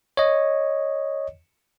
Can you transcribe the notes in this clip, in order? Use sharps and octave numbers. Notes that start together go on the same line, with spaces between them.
C#5 D#5